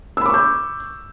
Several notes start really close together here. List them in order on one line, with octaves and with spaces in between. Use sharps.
E6 B5 D6 C#6 G6